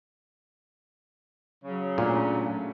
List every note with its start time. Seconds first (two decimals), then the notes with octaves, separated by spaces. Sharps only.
1.64 C#3 F#3
1.98 A#2 A3 C#4 D4